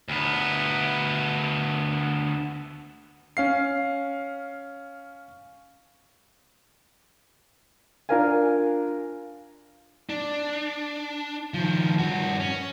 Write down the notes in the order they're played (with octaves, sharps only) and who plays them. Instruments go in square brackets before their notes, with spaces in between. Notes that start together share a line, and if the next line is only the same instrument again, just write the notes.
[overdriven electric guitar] D2 B3
[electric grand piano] C#4 F5 C7
[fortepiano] D4 F4 A#4 F5 G#5
[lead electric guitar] D4
D#3 F3
G2 F#4
C#4